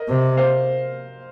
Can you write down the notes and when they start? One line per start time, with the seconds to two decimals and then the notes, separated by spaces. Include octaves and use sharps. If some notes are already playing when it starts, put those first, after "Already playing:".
Already playing: A#4 D#5
0.08 C3
0.37 C5 F5